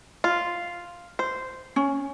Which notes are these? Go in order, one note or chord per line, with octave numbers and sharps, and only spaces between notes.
F4
C5
C#4